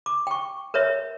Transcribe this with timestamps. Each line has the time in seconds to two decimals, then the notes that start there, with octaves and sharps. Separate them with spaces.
0.06 D6
0.27 G5 C#6
0.74 A#4 B4 C#5 E5